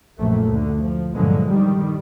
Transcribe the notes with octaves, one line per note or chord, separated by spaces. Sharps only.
A#1 F#2 A#2 A3
D2 D3
F3
G2 A#2 D3 F3 F#3 G#3
D#3 G3